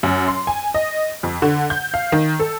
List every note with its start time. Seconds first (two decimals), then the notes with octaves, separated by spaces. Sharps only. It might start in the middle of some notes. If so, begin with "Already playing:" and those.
0.03 F#2
0.28 C6
0.47 G#5
0.74 D#5
1.23 F2
1.42 D3
1.70 G6
1.94 F5
2.12 D#3
2.40 A4